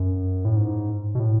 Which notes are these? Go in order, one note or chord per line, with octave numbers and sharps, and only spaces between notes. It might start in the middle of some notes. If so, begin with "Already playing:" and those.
Already playing: F#2
A2
G#2
B2
A2